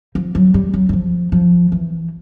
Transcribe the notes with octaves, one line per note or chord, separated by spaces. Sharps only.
F3
F#3
G3
F#3
F#3
F3
F3
E3